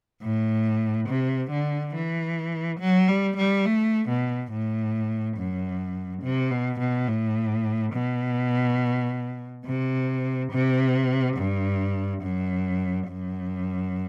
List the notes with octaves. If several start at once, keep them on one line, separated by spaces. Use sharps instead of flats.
A2
C3
D3
E3
F#3
G3
G3
A3
B2
A2
F#2
C3
B2
B2
A2
B2
C3
C3
G2
F#2
F#2